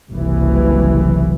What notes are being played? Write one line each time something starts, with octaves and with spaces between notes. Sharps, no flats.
F#1 C2 E3